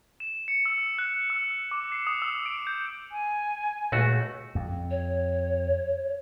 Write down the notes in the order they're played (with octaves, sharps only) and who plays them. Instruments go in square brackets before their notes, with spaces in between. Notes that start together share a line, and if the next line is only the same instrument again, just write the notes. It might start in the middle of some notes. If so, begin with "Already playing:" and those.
[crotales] E7
C#7
E6
F#6
E6
D6
C7
D#6
E6
D7
G6
[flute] G#5
[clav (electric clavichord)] C#2 A3 F#4 [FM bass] A#2
[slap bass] F2
[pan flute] C#5